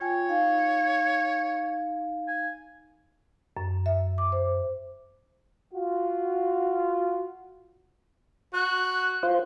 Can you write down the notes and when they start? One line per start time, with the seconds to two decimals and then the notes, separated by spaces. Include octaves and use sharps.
0.01 F4 C#5 G5 G#5
0.29 D#4 F5
2.28 G#5
3.57 F#2
3.86 E5
4.18 D6
4.32 C5
5.72 F4 F#4
8.53 F#4 F#6
9.23 F4 C5